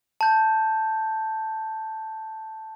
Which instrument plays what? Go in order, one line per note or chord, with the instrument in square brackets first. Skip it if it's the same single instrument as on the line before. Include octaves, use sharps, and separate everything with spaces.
[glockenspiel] A5 G6